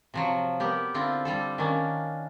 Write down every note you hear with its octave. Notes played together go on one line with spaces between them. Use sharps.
C3 F3 F#3
B3 G4 A#4
D3 C4 E4 F4
G3 D4 A4
D#3 A#3 C#4 D4